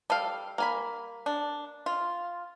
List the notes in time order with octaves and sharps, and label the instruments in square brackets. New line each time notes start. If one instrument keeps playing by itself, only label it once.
[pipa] G3 [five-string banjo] A4 F5
[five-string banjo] A#3 G#5 B5
[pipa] D4
F4